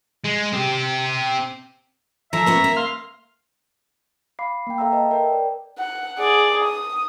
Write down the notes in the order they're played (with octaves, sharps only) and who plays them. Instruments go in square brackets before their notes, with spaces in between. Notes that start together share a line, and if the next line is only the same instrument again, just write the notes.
[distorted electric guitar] G#3
C4 G4
[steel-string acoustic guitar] D3 F3 [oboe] E5 [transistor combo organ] A#5
[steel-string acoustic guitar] A#3 B3 C#4
A#3
[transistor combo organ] F5 C6
[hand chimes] F5 B5 D6 C7
A#3 G5
A4 E5 F5 G5 A#5 E6
B4 D#5 A5
A#4 G5
D5
[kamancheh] F#5
G#4 D5
D#6